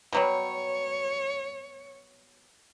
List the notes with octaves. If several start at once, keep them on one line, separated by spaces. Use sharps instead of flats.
B2 F#3 G3 C#5